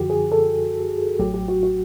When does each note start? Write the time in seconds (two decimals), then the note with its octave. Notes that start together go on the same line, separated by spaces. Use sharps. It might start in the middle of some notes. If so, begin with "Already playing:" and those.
Already playing: F#2 D3 F3 F#4 G4
0.10 G#4
0.32 A4
1.19 A1 A2 F#3 G4
1.34 G4
1.48 F#4
1.63 F#4